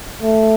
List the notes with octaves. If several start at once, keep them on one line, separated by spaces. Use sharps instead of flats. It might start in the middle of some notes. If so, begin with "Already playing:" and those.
A3